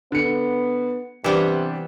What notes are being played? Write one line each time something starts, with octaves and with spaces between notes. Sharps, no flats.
D3 B3 C#7
C3 E3 G3 B3 D4 G4